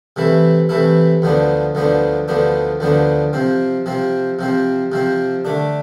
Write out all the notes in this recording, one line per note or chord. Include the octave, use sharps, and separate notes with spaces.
C3 E3 A3 E4
C3 E3 A3 E4
D2 D3 F3 B3 D4
D2 D3 F3 B3 D4
D2 D3 F3 B3 D4
D2 D3 F3 B3 D4
C3 F3 C4
C3 F3 C4
C3 F3 C4
C3 F3 C4
D3 A3 D4